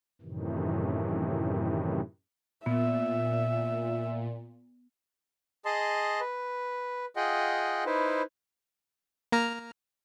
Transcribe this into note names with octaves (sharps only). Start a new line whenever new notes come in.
F#2 A2 C3 D#3 E3
A#2 B3 E5
G#4 D#5 A5 C6
B4
F4 G#4 D#5 F#5 G5
D#4 E4 B4 C5
A#3 A#5 F6